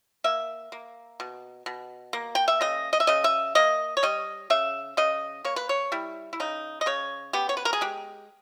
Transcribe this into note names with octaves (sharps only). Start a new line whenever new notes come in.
A#3 E5
A#3
B2
B2
A#3
G5
E5
C#3 D#5
D#5
E5
C#3 D#5
E5
A#3 D#5
C#5
G3 D#5
C#3 E5
C#3 D#5
A#3 C#5
B4
C#5
G3 E4
E4
C#3 D#4
D#5
C#3 C#5
B3 G4
C#5
B4
A#4
G#4
G#3 G4